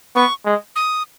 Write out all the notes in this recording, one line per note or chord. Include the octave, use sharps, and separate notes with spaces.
B3 C#6
G#3
D#6